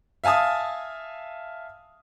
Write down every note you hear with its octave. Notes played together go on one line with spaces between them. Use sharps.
E5 F5 G#5 A5 D#6